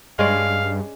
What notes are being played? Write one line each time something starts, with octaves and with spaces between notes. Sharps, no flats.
G2 G#3 C#4 D5 F5